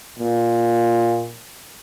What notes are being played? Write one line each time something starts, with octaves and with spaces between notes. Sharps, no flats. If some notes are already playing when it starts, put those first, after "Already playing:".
A#2